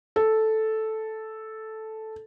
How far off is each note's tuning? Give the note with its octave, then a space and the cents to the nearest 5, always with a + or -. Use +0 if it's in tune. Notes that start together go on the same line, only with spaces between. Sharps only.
A4 -5